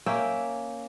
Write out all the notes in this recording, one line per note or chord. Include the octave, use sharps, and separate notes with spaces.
A#3 C#4 E5 G5